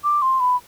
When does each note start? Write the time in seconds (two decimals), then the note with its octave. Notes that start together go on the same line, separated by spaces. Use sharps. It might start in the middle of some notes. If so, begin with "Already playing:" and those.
0.04 D6
0.22 C6
0.40 B5